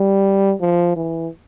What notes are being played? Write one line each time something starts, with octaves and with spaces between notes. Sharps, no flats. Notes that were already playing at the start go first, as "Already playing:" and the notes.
Already playing: G3
F3
E3